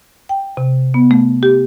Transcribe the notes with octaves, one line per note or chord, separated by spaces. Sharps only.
G5
C3
B3
A3
G4